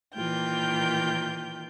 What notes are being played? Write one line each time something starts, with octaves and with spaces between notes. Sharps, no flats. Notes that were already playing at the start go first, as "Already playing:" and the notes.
A#2 D#3 E3 F4 G5 G6